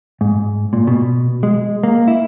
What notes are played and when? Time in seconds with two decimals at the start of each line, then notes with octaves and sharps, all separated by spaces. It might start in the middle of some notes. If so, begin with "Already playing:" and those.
0.21 G#2
0.73 A#2
0.87 B2
1.43 G#3
1.83 A#3
2.08 E4